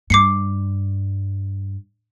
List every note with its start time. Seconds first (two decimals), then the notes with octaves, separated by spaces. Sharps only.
0.10 G2 D6 C7 C#7